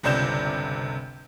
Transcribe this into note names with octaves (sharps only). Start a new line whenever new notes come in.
G1 C#2 C3 D5 G6 E7